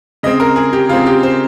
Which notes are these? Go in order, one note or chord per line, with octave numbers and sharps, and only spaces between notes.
C#3 G#3 C4 D#5
A#4
G#4
G4
C#3 G#3 C4 F4
G4
C5